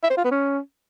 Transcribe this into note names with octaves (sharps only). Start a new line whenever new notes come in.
E5
C5
F4
B3
C#4